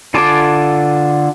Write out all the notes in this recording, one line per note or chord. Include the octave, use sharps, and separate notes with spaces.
D3 F4 G#5 A5 D6